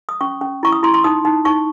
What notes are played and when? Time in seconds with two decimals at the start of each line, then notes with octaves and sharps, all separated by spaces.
0.09 D#6
0.21 C#4 C#6
0.41 C#4
0.63 E4 C#6
0.72 D#6
0.83 E4 C6
0.94 C6
1.04 D#4 D#6
1.25 D#4
1.45 D#4 C#6